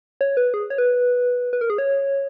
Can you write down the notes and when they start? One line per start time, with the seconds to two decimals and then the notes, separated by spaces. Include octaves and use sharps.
0.21 C#5
0.37 B4
0.54 G#4
0.70 C#5
0.78 B4
1.53 B4
1.61 A#4
1.70 G#4
1.78 C#5